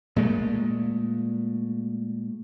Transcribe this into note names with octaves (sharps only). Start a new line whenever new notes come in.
A#2 G#3 A3